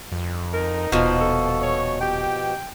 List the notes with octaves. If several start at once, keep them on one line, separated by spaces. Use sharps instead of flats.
F2
D#4 A#4
D#1 B2 F3 F4
A4
C#5
G4 G5